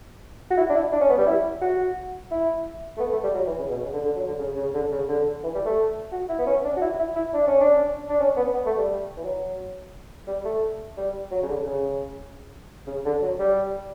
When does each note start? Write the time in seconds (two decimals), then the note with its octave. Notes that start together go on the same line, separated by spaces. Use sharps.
0.51 F#4
0.58 E4
0.70 D4
0.75 E4
0.93 D4
1.01 C#4
1.10 B3
1.18 G3
1.27 E4
1.62 F#4
2.31 E4
2.97 A3
3.00 B3
3.12 A3
3.23 G3
3.34 F#3
3.46 E3
3.58 C#3
3.70 B2
3.82 C#3
3.93 D3
4.04 D3
4.16 F#3
4.27 D3
4.38 C#3
4.56 C#3
4.74 D3
4.91 C#3
5.08 D3
5.43 E3
5.55 G3
5.65 A3
6.12 F#4
6.29 E4
6.39 B3
6.47 C#4
6.64 D4
6.76 F#4
6.81 E4
6.99 E4
7.16 E4
7.33 D4
7.47 C#4
7.61 D4
8.09 D4
8.20 C#4
8.37 B3
8.54 B3
8.66 A3
8.78 G3
9.17 E3
9.23 F#3
10.27 G3
10.45 A3
10.97 G3
11.31 F#3
11.43 C#3
11.48 D3
11.66 C#3
12.87 C#3
13.05 D3
13.22 F#3
13.39 G3